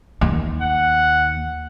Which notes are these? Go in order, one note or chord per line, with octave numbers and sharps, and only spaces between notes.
D#2
F#5